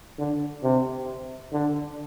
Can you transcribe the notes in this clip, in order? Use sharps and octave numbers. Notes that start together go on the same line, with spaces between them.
D3
C3
D3